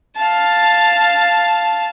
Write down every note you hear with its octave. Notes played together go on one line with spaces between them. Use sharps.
F5 A5